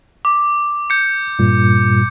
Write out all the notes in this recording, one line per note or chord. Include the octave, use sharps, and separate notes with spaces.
D6
D6 G6 C#7
G2 A#2 G3